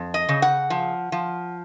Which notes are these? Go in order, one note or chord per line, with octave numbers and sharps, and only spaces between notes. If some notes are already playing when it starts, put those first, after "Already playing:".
Already playing: F2
D#5
C#3
F#5
F3
F3